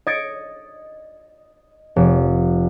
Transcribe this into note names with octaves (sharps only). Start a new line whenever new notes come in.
D#5 D#6 G#6 A6 C#7 D7
F1